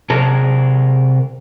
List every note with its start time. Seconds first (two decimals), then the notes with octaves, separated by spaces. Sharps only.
0.10 C3 G#4 A#4 A5